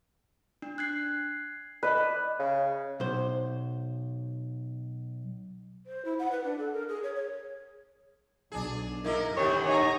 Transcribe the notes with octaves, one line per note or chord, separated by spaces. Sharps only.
D4
F#6 G#6 C7
B4 D5 D#5
C#3
B1 C5
C5
E4
F#5
B4
D4
A4
A#4
G#4
C#5
C#5
B1 D4 G#4
A#3 D#4 E4 A#4
D3 D#3 B3 G4 C#5
D#4 C#5 G#5 A#5